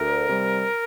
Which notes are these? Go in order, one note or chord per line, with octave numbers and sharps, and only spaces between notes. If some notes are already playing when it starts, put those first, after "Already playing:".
Already playing: D2 A#4
C3 G3